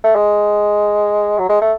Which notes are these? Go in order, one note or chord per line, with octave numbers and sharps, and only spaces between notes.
A3
G#3
F#3
G#3
A3